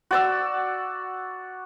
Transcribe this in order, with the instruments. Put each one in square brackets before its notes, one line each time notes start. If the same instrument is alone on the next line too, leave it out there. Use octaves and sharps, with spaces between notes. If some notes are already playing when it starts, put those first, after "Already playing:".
[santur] F#4 D5 E6